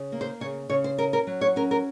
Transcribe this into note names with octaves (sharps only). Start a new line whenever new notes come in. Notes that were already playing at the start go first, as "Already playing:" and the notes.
Already playing: C#3
A#3
C5
C#3 C#5
C#3 C#5
C5
C#4 A#4
A#4
F#3
C#5
C#4 A#4
A#4